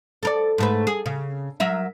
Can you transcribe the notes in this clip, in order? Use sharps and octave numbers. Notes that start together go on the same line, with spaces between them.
A4 A#4 D5
G#2 A3 B4
G#4
C#3
F#3 A#4 E5